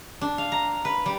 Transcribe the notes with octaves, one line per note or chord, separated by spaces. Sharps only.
D4
F5
A#5
B4
G3